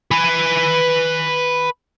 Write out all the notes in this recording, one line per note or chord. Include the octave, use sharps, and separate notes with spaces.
B4 G#5